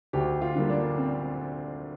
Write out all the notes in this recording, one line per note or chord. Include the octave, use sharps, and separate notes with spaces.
D2 G4
F4
D3 G3 A#3
D4
C4